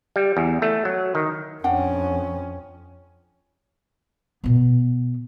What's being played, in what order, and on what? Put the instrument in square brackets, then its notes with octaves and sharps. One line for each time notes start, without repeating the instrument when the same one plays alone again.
[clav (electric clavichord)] G3
E2
A3
F#3
D#3
[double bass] F2 C#4 [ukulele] D4 F#5 G5
[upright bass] B2 B3